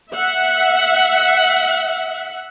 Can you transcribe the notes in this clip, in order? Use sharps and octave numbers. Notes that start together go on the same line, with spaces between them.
E5 F#5